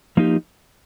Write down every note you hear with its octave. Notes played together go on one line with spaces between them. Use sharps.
F3 A#3 D#4 G4